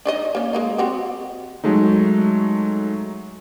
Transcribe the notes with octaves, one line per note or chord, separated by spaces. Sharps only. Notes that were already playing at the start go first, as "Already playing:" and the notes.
D4 D#4 D#5
A#3 C#4
G#3 A#3 D#4
C4 F#4 G4
F#3 G#3 A3 D#4